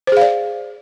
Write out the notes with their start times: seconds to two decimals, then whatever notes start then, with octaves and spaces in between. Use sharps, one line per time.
0.07 C5
0.12 G#4
0.17 F5
0.21 D5